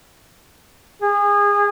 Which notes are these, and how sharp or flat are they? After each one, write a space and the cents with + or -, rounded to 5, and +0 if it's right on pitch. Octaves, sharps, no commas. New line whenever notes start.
G#4 -30